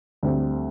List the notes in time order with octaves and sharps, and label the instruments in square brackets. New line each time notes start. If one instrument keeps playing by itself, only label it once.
[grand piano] D2 D3 G3 C4